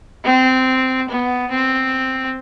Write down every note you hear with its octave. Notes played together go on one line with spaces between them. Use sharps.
C4
B3
C4